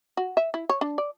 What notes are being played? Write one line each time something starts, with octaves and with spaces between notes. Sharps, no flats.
F#4
E5
E4
C#5
D4
D5